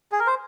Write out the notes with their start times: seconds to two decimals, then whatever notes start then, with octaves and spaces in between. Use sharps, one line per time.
0.12 G#4
0.20 A#4
0.27 C5